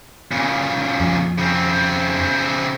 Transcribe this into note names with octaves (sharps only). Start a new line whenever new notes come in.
A#2 C#3
F2
C#3 C4